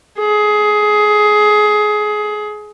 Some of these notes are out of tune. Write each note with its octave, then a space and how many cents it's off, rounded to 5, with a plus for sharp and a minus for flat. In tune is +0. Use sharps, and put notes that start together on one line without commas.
G#4 +20